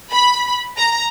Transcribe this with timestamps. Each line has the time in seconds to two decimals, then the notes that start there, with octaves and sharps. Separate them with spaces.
0.11 B5
0.78 A#5